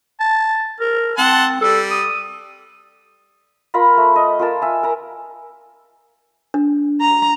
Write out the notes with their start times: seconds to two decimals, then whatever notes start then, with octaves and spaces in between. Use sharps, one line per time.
0.20 A5
0.80 A#4
1.18 C4 F#5 A5 C6
1.61 G3 A4
1.91 D#6
3.74 F4 A#4 A#5 B5
3.97 A3
4.16 D#5
4.39 F4 A#4 A5
4.62 E5 G#5
4.83 A#4 A#5
6.54 D4
7.01 A#5